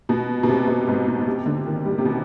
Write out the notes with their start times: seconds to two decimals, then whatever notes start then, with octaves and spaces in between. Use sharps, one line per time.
0.09 B2
0.43 B2
0.48 C3
0.67 B2
0.87 G#2
1.07 B2
1.21 B2
1.27 C3
1.46 D3
1.66 D#3
1.85 G3
1.98 C3
2.05 B2